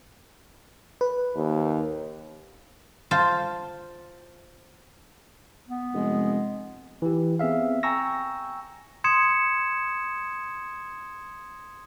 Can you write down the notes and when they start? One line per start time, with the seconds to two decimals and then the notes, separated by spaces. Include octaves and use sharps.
1.01 B4
1.36 D#2
3.11 F4 C5 A5
5.69 B3
5.94 F1 G#3
7.02 E3 G4
7.39 B3 C4 G#4 E5 F5
7.83 G5 G#5 A#5 C#6 E6 A#6
9.04 C6 D#6 G#6 C#7 E7